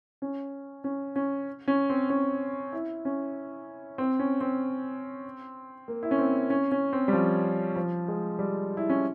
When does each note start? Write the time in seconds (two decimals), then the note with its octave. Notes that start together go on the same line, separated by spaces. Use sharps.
0.22 C#4
0.84 C#4
1.16 C#4
1.68 C#4
1.90 C4
2.10 C#4
2.73 E4
3.05 C#4
3.98 C4
4.19 C#4
4.41 C4
5.88 A#3
6.03 E4
6.11 C#4
6.19 C4
6.50 C#4
6.72 C#4
6.93 C4
7.08 G3
7.13 F3
7.76 F3
8.08 G#3
8.39 G3
8.77 E4
8.89 C#4